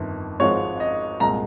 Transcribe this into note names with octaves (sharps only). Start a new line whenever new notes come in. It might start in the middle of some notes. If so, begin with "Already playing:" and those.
Already playing: G1 F2 D#3
G#1 G#2 F3 G#3 C4 C#5
D#5
C2 A#2 G#3 A#5